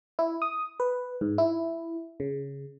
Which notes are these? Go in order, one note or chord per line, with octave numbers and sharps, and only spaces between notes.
E4
D#6
B4
G#2
E4
C#3